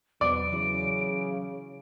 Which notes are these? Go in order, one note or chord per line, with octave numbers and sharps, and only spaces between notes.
E2 B2 F#3 B4 D5 D7
C#3 E3 F#3 E4